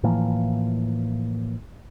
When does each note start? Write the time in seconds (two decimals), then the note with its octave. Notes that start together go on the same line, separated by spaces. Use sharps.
0.03 A2 E3 F3 A#3